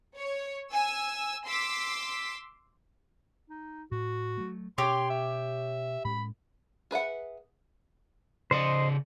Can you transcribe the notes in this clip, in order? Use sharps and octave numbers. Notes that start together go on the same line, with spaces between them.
C#5
G#5 E6
C6 D6 E6 B6
D#4
A2 F#4
F#3 A3
B2 C#4 G4 C#5 C6
E5
A2 G#3 C#4 B5
G#4 B4 E5 F#5
C#3 C5 D5 D#5